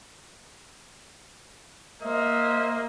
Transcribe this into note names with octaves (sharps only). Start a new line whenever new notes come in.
A#3 C5 D#5 E5